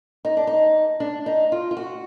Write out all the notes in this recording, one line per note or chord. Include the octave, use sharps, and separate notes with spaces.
D#4
D4
D#4
D4
D#4
F4
F4
F#4